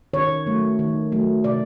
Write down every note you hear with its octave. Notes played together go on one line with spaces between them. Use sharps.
D#3 C#5
F#3 A3
D#3
F#3 A3
C3 D5